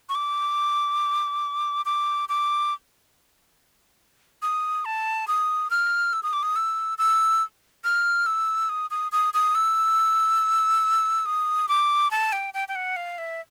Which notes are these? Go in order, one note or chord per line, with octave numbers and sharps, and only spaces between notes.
C#6
D6
D6
D6
D#6
A5
D#6
F6
E6
D#6
D6
D#6
E6
E6
F6
E6
D#6
D#6
D#6
D#6
E6
D#6
D6
A5
G5
G5
G5
F#5
F5
E5